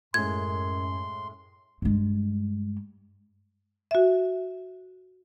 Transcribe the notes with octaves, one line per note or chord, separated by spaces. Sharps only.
F#2 A2 G#3 C#4 C6 G#6
G2 G#3
F#4 E5